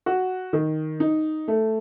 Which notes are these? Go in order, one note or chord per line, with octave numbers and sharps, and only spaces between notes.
F#4
D#3
D#4
A3